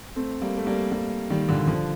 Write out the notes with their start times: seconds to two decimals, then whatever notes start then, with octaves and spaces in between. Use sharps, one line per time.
0.16 A3 C4
0.42 G3 A#3
0.57 A3
0.67 G3 A#3
0.92 G3 A#3
1.30 D#3 G3
1.49 A#2 D3
1.67 D3 F3